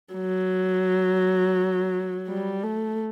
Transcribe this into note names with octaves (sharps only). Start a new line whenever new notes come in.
F#3
G3
A3